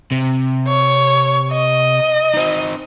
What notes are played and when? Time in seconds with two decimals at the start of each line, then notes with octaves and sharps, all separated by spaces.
0.12 C3
0.68 C#5
1.52 D#5
2.34 C4 D#4